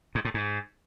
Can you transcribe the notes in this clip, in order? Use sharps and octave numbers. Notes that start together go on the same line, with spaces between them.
G#2
A2
G#2